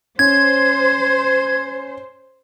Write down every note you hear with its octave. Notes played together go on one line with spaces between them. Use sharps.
C#4 C5 G#6